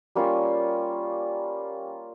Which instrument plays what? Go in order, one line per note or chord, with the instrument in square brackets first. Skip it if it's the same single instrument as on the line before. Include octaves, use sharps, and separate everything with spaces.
[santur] G3 A#3 C#4 F4